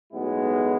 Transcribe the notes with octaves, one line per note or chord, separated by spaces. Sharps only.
B1 A2 G#3 B3 E4